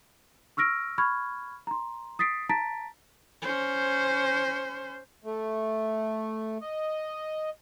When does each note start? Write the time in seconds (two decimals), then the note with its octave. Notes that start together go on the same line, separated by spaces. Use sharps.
0.57 C#6 E6 F6 A#6 D7
0.98 B5 C#6 F6 G#6
1.67 A#5 C6
2.19 D#6 A6 B6 C7 D7
2.49 A5 A#5 A6 B6 D7
3.42 C#4 C5
5.24 A3
6.61 D#5